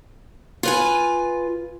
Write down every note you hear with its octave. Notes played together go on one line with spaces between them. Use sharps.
F4 B4 G#5